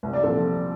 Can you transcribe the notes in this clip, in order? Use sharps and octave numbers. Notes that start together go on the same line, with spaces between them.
C2
D5
A#2 F3 C4 A4